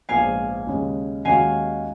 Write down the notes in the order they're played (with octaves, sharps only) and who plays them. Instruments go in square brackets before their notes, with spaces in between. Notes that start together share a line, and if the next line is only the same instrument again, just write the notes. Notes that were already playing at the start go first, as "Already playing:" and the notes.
[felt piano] A#1 G#2 F3 B3 [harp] F5 G#5
[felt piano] D#2 C#3 G#3 C#4
[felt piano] D#2 D#3 G#3 C#4 F#4 [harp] F5 G#5